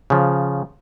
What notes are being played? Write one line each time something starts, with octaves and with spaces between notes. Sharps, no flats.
C#3 F3